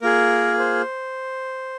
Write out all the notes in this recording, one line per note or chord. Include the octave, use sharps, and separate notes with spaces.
A#3 F4 G#4 A#4
C5